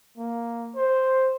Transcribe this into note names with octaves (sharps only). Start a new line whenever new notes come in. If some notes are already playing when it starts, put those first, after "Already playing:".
A#3
C5